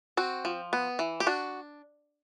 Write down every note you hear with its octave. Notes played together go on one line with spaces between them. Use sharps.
C4 F#4
F3
B3
E3
G4
D4 F#4